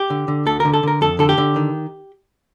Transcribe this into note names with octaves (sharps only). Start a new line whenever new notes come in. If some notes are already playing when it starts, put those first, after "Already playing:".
Already playing: G4
D3
D3
D2 A4
D3 A#4
A4
D3 A#4
F2 A4
D3 A4
G4
D3
D#3